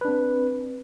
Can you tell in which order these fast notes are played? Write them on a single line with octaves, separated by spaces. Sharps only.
B4 D4 C4